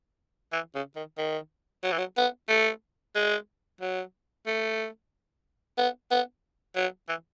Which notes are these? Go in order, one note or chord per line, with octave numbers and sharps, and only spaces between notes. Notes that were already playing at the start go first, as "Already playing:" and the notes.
E3
C#3
D#3
D#3
F#3
E3
F#3
B3
A3
G#3
F#3
A3
B3
B3
F#3
E3